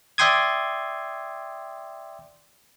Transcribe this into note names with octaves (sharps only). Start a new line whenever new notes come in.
D5 E5 G5 C6 D#6 G#6